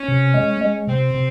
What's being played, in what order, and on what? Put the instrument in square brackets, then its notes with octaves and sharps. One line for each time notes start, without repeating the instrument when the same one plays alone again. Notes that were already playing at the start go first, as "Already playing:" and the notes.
Already playing: [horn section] C#4
[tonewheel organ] C3
G#3
G#3
[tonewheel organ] C3 [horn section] C4
[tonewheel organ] C3